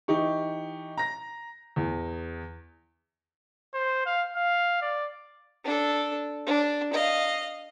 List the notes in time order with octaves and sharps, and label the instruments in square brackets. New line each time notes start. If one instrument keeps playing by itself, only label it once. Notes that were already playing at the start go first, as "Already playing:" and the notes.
[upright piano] E3 D#4 G4 C#6
A#5 A#6
E2
[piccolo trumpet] C5
F5
F5
D5
[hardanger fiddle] D4 A4
D4
D#5 F5